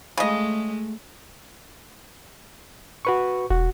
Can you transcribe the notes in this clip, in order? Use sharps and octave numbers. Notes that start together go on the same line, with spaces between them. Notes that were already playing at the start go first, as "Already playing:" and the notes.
C#3 G#3 A3 D#5
F#4 B4 C#6
E1 F#4